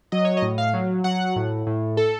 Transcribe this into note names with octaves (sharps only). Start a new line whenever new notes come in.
F#3 D#5
C#5
D#5
A2
F5
F#3
F#3 F#5
A2
A2
A4